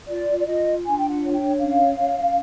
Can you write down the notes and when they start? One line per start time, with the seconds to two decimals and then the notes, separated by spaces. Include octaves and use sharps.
0.08 F4 D5
0.39 D5
0.46 F4 D#5
0.84 D4 G#5
0.97 G5
1.10 F#5
1.22 C#5
1.34 G5
1.59 C#4 F5
1.98 C#4